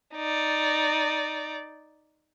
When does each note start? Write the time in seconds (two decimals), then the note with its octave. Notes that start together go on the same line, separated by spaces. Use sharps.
0.15 D#4 D5